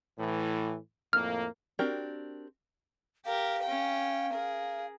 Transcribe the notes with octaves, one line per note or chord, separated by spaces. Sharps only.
A2 E3
F2 A2 A#3 F6
C4 D4 F#4 G4 A#4
G4 A#4 F5
C#4 G5
G#4 A#4